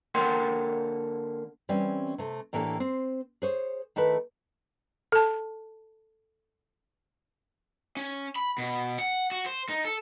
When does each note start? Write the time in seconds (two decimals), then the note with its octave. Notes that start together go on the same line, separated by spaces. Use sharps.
0.15 D3 A#3 A#4 F#5 G5 C6
1.69 E3 G3 C4 C#4
2.18 C3 A3
2.53 A2 E3 A#3 D4 G4 A4
2.80 C4 C5
3.42 G#4 C5 C#5
3.96 D#3 A3 E4 B4
5.12 A4 A5
7.97 C#4
8.36 B5
8.58 B2
8.99 F#5
9.31 F#4
9.46 C5
9.69 D#4
9.85 A4